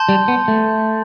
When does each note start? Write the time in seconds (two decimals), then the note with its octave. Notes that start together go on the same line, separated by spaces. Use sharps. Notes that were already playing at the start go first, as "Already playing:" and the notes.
Already playing: A5 C6 G6
0.09 G3
0.28 B3
0.48 A3